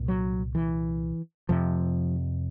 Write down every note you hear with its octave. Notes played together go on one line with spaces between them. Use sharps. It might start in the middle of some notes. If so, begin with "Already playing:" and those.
Already playing: C2 A#2
F#3
E3
F2 C3 F3